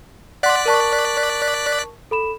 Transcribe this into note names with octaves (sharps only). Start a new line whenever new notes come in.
D5 F#5 C6 F#6 B6
A#4 A5 C#6
A4 B5 E7